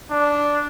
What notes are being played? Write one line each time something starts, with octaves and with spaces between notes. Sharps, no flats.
D4